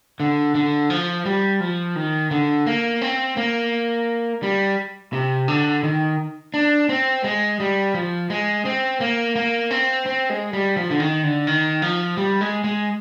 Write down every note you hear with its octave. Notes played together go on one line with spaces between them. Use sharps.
D3
D3
F3
G3
F3
D#3
D3
A#3
C4
A#3
G3
C3
D3
D#3
D4
C4
G#3
G3
F3
G#3
C4
A#3
A#3
C4
C4
G#3
G3
F3
D3
D#3
D3
D#3
F3
G3
G#3
G#3